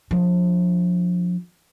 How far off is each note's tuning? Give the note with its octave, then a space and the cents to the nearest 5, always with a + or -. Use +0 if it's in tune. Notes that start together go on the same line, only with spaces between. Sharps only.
F3 +30 D4 +0